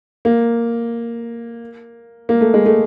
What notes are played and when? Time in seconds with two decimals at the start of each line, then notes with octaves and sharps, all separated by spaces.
0.25 A#3
2.29 A#3
2.41 A3
2.54 G#3
2.66 A3